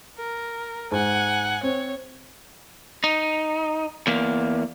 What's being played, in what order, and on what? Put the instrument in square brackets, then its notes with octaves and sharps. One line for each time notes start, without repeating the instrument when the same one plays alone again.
[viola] A#4
[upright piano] G#2 [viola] F#5 G#5
[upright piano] C4 [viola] C#5
[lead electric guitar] D#4
E2 A#3